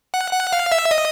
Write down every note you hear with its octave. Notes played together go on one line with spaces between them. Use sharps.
F#5
F#5
F5
E5
D#5